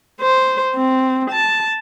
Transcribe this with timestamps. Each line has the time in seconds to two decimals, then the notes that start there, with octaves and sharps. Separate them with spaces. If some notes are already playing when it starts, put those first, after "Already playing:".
0.21 C5
0.75 C4
1.31 A5